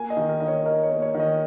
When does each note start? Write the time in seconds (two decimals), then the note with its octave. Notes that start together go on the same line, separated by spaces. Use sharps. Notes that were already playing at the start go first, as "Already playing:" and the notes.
Already playing: A#3 G#5
0.10 D#5
0.17 D#3
0.29 A#4
0.40 D#3 D#5
0.48 C#5
0.66 D#4 A#4
0.83 C#5
0.90 A#3
1.02 C#5
1.15 D#3
1.20 D#5